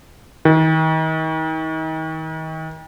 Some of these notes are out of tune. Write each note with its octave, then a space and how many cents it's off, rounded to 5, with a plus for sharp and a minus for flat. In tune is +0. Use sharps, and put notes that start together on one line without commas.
D#3 +35